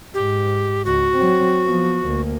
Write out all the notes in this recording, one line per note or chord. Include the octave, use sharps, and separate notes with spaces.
G#2 G4
C#2 F#4
F#3 C4
F3 B3
D2 A#3